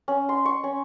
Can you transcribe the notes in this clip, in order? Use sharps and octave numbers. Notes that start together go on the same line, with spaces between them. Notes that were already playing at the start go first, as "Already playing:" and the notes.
C#4
C6
C#6
C#4